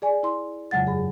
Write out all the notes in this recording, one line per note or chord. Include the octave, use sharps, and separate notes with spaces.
G#4 D5 G#5
E4 C6
F2 C#3 F#3 G#3 F#5 A6
G2 G#4